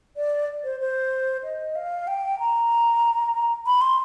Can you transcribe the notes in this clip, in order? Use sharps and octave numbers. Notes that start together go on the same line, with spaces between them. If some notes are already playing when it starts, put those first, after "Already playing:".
D5
C5
C5
D#5
F5
G5
A#5
B5
C6